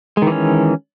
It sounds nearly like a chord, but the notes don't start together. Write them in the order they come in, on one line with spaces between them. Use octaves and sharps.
G#3 D#3 E3 C#4